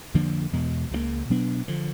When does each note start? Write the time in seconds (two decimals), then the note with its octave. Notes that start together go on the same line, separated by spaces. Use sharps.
0.14 F2 D3 F3 A#3
0.53 E2 B2 G#3
0.91 C#2 C#3 F3 A#3
1.30 B2 F#3 B3 D4
1.68 D3 F3